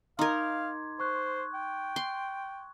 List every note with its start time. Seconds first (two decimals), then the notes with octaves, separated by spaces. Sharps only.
0.19 D#4 A#4 F5 C6 D6 G#6
1.00 C5 C#6 F#6
1.54 G5
1.96 C6